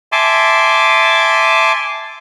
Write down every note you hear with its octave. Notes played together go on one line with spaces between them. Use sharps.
E5 G#5 A5 C6 D6